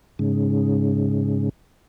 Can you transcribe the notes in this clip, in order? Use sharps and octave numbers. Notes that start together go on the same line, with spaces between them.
G#2 C#3